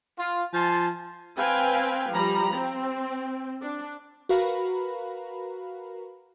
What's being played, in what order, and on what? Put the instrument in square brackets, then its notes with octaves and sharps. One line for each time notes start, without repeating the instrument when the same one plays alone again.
[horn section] F4
F3 G#5 A5 C6
[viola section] C4 B4 F5 G5 G#5
F3 G3 A#5 B5
C4
D4
[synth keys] F#4 A#4 B4 F5 A#5 B5